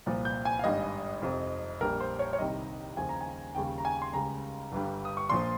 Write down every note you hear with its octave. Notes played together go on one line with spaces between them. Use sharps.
C2 A#2 F3
G6
G#5
F5
G#1 G2 G3 D#5
F2 C3 F3
A#1 A#2 G3 A#4
C5
C#5
C#5
C2 C3 D#3 G3 D#5
D#2 C#3 F3 G#5
A#5
G#5
D#2 C#3 G3 G5
A#5
G#5
C6
C#2 C#3 G3 A#5
G1 G2 G3
D#6
C#6
A#1 A#2 F3 C6